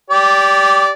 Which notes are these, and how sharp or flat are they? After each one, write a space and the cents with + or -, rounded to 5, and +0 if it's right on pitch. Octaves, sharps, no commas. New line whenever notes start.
G4 +0 D5 -20